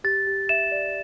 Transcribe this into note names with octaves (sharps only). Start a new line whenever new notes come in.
G4 A6
G4
E5 E7
D5